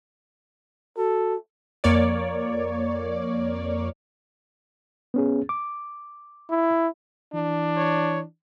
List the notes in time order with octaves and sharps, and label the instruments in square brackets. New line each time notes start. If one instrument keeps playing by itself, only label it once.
[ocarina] F#4 [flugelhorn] A4
[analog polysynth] F2 A#3 C#5 D5
[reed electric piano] B3 C#4 G#4
D6
[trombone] E4
[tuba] E3 [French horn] D4
[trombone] C#5